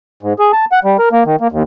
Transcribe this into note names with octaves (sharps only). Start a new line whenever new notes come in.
G#2
G#4
A5
F#5
G3
A#4
A#3
D#3
A#3
D#2